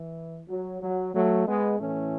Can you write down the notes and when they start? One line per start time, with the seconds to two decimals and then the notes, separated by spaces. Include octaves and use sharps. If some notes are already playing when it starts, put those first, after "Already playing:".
Already playing: E3
0.48 F#3
0.81 F#3
1.13 F#3 A3
1.46 G#3 B3
1.78 A2 E3 A3 C#4